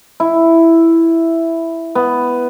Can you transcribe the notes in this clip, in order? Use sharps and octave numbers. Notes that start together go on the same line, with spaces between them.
E4
B3